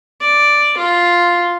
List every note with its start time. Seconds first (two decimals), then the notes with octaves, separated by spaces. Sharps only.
0.21 D5
0.77 F4